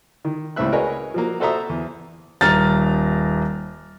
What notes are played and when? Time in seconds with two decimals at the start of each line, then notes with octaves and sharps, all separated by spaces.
0.25 D#3
0.56 C#2 A2 A3 C4 E5 F#6
0.72 F#4 G#4 A#4 B4 C#5 D#5
1.14 F3 F#3 A#3
1.40 F#4 A4 C5 E5 A#5 D#6
1.69 E2
2.41 D#1 A#5 F6 A6